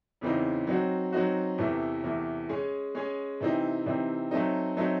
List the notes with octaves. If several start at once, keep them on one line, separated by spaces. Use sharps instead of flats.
E2 C#3 E3 C4 D#4
F#3 C4 D#4 F#4
F#3 C4 D#4 F#4
E2 C3 E3 A3
E2 C3 E3 A3
G#3 C#4 G#4
G#3 C#4 G#4
C3 E3 C4 D#4
C3 E3 C4 D#4
F#3 A3 C4 D#4
F#3 A3 C4 D#4